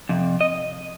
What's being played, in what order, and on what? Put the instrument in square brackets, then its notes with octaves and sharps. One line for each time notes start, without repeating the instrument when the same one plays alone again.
[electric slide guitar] F2 C3
D#5